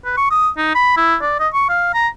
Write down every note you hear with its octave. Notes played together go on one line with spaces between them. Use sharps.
B4
C#6
D#6
D#4
B5
E4
D5
D#5
C#6
F5
A#5